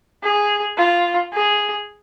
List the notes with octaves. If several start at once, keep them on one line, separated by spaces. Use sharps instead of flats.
G#4
F4
G#4